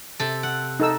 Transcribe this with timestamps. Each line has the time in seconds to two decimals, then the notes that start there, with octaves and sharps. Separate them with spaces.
0.19 C3 A4
0.43 F#5
0.80 D#4 A4 E6